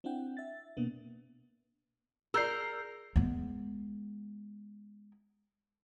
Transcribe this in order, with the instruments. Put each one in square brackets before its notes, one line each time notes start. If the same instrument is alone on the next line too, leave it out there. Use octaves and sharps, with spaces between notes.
[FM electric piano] C4 D4 E4 F#5 G5
E5 A6
B2 A#3 B3 D4
[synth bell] G#4 D5 [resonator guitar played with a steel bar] A#4 [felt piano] E6 G6 C7
[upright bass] G#3 B3